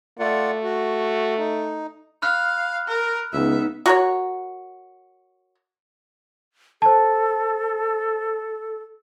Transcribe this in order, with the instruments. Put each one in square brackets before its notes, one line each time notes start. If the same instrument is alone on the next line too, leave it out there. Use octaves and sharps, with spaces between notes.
[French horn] A3 [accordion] F4 D5 F#5
[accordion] F#4
D#4
[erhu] F5 [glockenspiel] B5 F6 F#6
[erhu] A#4
[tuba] C#2 [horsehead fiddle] B3 D#4 [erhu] E5
[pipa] F#4 A#4 C#5
[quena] A4 [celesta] C5 A5